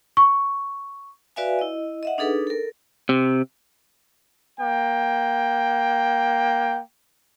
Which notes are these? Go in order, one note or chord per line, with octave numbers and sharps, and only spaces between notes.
C#6
F#4 B4 D5 E5 F5 G#5
E4 D#5
D#5 E5 F#5
D4 D#4 G#4 A4 B4
A4 A#4
C3
A#3 G5